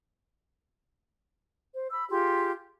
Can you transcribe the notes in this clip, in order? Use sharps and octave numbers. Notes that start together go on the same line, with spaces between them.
C5
B5 E6
F4 G4 G#4 C6